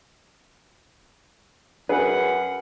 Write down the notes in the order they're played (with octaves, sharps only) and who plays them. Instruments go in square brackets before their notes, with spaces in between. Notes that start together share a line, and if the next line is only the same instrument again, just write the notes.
[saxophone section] F#2 F#5 [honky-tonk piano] G#4 B4